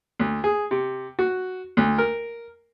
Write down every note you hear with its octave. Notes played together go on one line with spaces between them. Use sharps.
D2
G#4
C3
F#4
D2
A#4